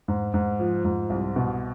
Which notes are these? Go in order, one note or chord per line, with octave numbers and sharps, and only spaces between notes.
G#2
G#2
F3
G#2
C2
B2